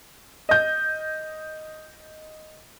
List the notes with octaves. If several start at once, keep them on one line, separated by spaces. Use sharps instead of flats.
D#5 G6